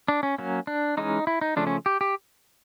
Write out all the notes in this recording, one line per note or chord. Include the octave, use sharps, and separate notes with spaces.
D4
C#4
F#3 A#3 C#4
D4
E3 G#3 C#4 D#4
E4
D#4
C#3 F3 A3 C#4 D4
C#4
G4
G4